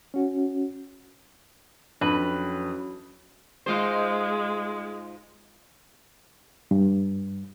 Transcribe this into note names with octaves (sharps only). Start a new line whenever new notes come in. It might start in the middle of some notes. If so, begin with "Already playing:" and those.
C#4 F#4
F2 E3 F#3 C#4 D4 B4
G#2 G#3 F4 C5
G2